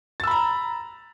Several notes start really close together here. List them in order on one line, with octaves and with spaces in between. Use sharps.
A6 E6 B5 A#5